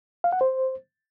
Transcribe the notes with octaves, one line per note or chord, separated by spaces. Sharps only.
F5
F#5
C5